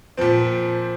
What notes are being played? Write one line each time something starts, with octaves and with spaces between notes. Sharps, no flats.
A#2 F3 C4